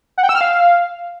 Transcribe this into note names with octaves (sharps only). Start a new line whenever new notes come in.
F#5
G5
E6
F6
F5